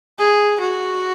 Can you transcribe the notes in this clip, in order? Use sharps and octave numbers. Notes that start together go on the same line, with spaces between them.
G#4
F#4